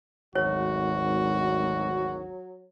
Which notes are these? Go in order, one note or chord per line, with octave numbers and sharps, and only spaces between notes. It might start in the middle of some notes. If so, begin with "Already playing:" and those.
G#1 D2 F#3 F#4 C#5